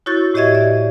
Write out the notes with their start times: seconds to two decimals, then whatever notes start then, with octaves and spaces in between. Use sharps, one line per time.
0.06 E4 F#4 C#5 C#6 G6 A6
0.34 A2 G4 C#5 D#5 E5 G#6
0.55 D5